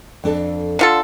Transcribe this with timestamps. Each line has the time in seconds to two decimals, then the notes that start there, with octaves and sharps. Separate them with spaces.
0.24 F2 D4 A4
0.79 D3 F4 A4